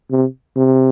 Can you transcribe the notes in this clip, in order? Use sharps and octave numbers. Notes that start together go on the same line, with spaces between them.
C3
C3